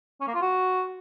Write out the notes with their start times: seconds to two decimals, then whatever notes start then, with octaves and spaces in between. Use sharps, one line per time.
0.21 C#4
0.27 A#3
0.34 F4
0.41 F#4